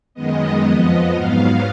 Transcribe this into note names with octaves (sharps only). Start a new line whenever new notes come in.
F#2 D#3 G#3 B3 D#5
F2 F3 B3
G#2 F#3 B3 F5